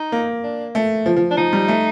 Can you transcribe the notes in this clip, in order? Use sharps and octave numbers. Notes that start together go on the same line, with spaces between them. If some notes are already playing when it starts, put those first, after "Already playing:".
Already playing: D#4
A#3
D4
A3
F3
F3
D4
F3 D#4
G3
A3